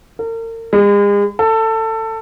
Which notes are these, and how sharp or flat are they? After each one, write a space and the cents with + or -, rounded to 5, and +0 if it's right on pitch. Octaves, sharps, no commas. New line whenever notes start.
A#4 -40
G#3 -40
A4 +20